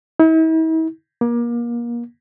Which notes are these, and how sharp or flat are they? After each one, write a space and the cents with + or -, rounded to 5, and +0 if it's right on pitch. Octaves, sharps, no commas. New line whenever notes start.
E4 -45
A#3 +30